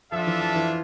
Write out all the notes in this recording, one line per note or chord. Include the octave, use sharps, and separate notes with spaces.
F3 D4 F4 A4 E5
E3
F3
E3